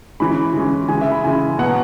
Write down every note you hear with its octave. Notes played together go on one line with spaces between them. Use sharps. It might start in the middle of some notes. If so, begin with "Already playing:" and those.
E3 G#3 C#4 B5
E3 G#3 C#4
C#3 E3 G#3 G#5
E5
B5
C#3 E3 G#3 G#5
B2 F#3 B3 F#5